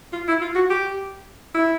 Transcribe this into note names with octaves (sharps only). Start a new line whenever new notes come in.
F4
E4
F4
F#4
G4
E4